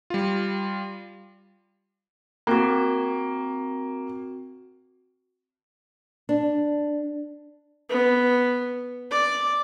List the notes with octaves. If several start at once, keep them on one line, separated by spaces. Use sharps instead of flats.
G3 F4
A#3 C4 F#4
D4
B3
D5